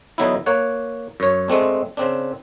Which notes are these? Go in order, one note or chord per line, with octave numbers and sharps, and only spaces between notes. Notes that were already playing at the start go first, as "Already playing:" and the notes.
D3 E3 F#3 B3 D#4 E4
A#3 C#5 F#5
F#2 C#5
G#3 A3 C4 D4
C#3 C4 D4